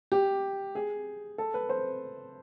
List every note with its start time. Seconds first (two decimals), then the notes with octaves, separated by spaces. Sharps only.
0.12 G4
0.75 G#4
1.38 A4
1.54 B4
1.69 C5